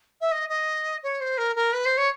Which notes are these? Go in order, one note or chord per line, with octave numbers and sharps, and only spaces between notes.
E5
D#5
D#5
C#5
C5
A#4
A#4
B4
C5
C#5